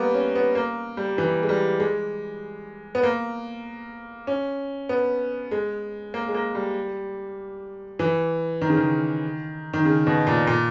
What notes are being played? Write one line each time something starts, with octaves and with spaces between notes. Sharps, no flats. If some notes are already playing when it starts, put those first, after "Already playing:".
Already playing: G3 A#3 B3
C#4
B3
A#3
G3
E3
G#3
G3
G#3
B3
A#3
C#4
B3
G#3
A#3
G#3
A#3
G3
E3
D#3
C#3
D#3
D#3
C#3
B2
A#2
A#2